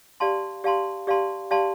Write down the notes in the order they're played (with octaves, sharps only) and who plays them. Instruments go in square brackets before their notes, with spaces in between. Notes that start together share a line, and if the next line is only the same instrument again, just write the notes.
[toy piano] G4 D5 F5 A5 C6
G4 D5 F5 A5 C6
G4 D5 F5 A5 C6
G4 D5 F5 A5 C6